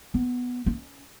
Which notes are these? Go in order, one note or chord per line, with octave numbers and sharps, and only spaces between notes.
B3
C#4